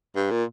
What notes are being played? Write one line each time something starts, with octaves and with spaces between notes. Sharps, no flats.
G2
A#2